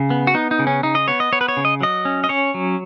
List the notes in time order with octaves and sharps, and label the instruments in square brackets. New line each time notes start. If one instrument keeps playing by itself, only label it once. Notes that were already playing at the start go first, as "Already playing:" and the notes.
Already playing: [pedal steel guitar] C#3
B3
F#4
B3 D#4
D#4
C#3
C#4
C#3 D#4
D#5
B3 C#5
D#5
B3 C#5
B4
C#5
C#3
D#5
F#3 D#5
C#4
D#5
C#4 C#5
F#3